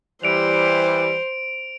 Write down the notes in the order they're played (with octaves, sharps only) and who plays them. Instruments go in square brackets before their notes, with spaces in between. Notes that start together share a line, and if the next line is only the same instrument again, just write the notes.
[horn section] E3 G3 [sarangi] C5 [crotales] D7 F7